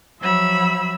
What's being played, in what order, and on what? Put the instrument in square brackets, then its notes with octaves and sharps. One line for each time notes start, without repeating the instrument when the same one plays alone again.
[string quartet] F3 F#3 E5 B5 E6